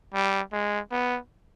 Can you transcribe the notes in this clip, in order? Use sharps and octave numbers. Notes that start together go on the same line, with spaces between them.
G3
G#3
B3